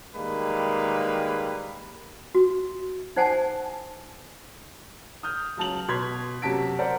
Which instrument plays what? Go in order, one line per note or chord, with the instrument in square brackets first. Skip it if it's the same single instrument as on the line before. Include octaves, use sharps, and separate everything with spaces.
[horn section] D#3 G3 G#3 A#3 B4
[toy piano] F#4
D#4 C5 F#5 G#5 A5
[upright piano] D#6 F6 G6
C#2 F#3 A5 F7 F#7
B2 C6 G#6 B6
F#2 C3 F#4 A5 B6 D7
A#4 C5 D5 F#5